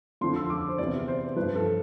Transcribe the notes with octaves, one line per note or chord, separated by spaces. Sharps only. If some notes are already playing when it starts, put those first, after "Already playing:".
F2 D3 F3 C6
E6
D6
C5
E2 C3 E3 D5
C5
G2 F3 B4
A4